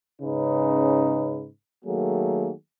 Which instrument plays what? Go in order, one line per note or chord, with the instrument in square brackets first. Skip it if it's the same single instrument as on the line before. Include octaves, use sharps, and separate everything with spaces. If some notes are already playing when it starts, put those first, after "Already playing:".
[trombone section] G#2 C#3 C#4 D#4 B4
D#3 F#3 A3 A#3 F#4 G#4